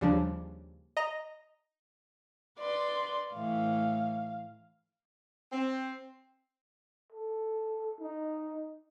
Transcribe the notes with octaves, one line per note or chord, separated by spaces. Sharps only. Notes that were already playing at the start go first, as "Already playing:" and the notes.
D#2 C#3 F3 G3 D4
D#5 A#5 A#6
B4 D5 C6
A2 E3 F5
C4
A4
D#4